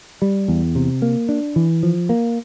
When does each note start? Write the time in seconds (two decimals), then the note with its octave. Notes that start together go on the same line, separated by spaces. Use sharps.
0.22 G3
0.48 E2
0.75 C3
1.02 A#3
1.29 D4
1.56 E3
1.83 F3
2.09 A#3